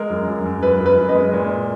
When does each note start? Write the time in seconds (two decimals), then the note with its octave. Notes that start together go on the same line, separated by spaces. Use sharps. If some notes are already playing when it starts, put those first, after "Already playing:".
Already playing: G#3 A#4
0.10 F#2
0.28 F#2
0.46 F#2
0.63 F#2 B4
0.80 F#2
0.86 B4
0.98 F#2
1.09 B4 D#5
1.15 G#3
1.33 A#2
1.50 A#3